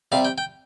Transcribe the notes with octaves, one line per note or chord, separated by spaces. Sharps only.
C3 G3 F5
G5
G5